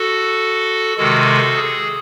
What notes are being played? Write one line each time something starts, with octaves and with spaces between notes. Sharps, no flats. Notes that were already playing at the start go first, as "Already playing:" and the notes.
Already playing: F#4 A4
C3 D#3 G#3 F#4 A4
G#4